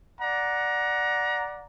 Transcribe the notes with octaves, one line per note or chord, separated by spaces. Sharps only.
D5 F#5 A#5